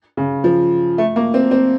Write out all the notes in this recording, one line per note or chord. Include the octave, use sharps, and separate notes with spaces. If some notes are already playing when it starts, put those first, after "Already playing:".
C#3
F3
A3
A#3
C4
C4